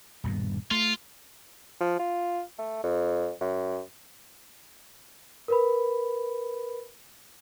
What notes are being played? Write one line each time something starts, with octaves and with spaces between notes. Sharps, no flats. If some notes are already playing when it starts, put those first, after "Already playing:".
D#1 G2 B2
A3 F4
F3
F4
A3
F2
F#2
A#4 B4 B5